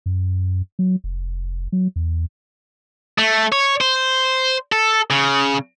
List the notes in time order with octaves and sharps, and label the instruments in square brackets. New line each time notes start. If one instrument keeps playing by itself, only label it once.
[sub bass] F#2
F#3
F1
F#3
E2
[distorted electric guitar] A3
C#5
C5
A4
C#3